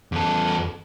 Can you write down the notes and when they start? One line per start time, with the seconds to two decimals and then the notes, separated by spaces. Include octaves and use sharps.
0.12 E2 A4